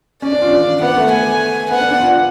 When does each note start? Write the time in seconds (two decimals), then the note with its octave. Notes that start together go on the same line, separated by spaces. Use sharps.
0.22 C#4 D5
0.32 D4
0.42 F4
0.52 D4
0.82 B3 F#5
0.97 A3
1.12 G#5
1.70 B3 F#5
1.80 D4
1.91 D4
2.01 F4